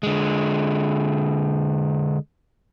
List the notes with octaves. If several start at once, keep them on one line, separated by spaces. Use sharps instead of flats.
D3 G#3